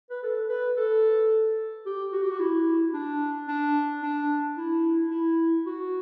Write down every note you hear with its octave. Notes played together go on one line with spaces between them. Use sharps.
B4
A4
B4
A4
G4
F#4
G4
F#4
E4
D4
D4
D4
E4
E4
F#4